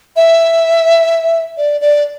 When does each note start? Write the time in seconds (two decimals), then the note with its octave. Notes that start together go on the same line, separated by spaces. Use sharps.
0.16 E5
1.57 D5
1.81 D5